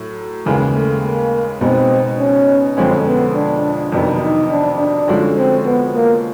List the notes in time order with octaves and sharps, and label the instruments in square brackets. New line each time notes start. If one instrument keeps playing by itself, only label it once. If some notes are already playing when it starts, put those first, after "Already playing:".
Already playing: [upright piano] A2 F#3
D#2 C#3 E3 G#3
[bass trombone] A3
A#3
[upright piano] B2 G#3 B3 D#4 [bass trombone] C4
[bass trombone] C#4
[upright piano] F2 D3 F3 G#3 C#4 [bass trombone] C4
[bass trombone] B3
D4
[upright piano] F2 C3 D#3 F#3 B3 [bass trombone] D4
[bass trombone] D#4
D4
D4
[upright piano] D3 F3 G#3 C#4 F#4
[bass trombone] C4
B3
A#3